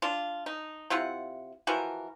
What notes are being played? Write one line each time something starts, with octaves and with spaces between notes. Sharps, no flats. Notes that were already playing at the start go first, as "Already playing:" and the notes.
D4 F4
D#4
C3 E4 F4 F#5
E3 F3 F#4 A#4